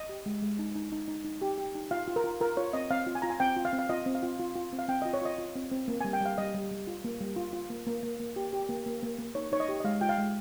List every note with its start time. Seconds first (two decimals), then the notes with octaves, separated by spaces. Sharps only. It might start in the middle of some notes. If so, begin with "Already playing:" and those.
Already playing: D#5
0.09 G4
0.26 G#3
0.42 G#3
0.59 D#4
0.75 D#4
0.92 D#4
1.08 D#4
1.25 D#4
1.42 G4
1.58 G4
1.75 D#4
1.91 F4 F5
2.08 F4
2.16 A#4
2.24 F4
2.41 F4 A#4
2.57 F4 C#5
2.73 C4 D#5
2.91 C4 F5
3.07 F4
3.15 G#5
3.22 F4 A#5
3.30 G#5
3.40 C4 G5
3.56 F4
3.65 F5
3.73 C4
3.79 F5
3.89 F4 D#5
4.06 C4
4.15 F5
4.23 F4
4.39 F4
4.56 F4
4.73 C4
4.79 F5
4.88 C4 G5
5.02 D#5
5.05 F4
5.14 C#5
5.22 F4 D#5
5.38 F4
5.56 C4
5.71 C4
5.88 A#3
6.01 G3 G#5
6.13 G5
6.21 G3 F5
6.38 G3 D#5
6.54 G3
6.71 G3
6.87 F4
7.04 A#3
7.21 G3
7.36 F4
7.53 F4
7.70 A#3
7.86 A#3
8.03 A#3
8.20 A#3
8.36 G4
8.53 G4
8.69 A#3
8.86 A#3
9.03 A#3
9.19 A#3
9.35 D#4 C#5
9.52 D#4 C#5
9.60 D#5
9.69 G4
9.80 D#5
9.84 G#3 F5
10.01 F4 G5
10.09 F5
10.18 G#3